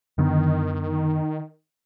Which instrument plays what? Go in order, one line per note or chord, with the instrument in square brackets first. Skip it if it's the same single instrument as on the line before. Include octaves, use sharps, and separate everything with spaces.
[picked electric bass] F#2 D3 B3 [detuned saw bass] D#3